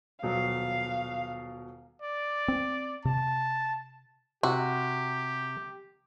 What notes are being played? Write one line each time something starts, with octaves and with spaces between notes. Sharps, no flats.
D#1 B2 F#3 F5
D5
C4
C3 A5
C3 F#4 G4